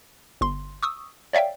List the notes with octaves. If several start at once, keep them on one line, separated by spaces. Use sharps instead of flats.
G1 C6
C#6 D#6 E6
C#5 D5 E5 F5 G5